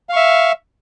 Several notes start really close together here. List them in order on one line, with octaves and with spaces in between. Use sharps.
F5 C#6 E5